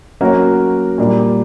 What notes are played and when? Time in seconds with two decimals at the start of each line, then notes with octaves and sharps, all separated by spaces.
0.21 F#3 A#3 C#4 F#4 A#4
0.98 A#2 G3 A#3 D4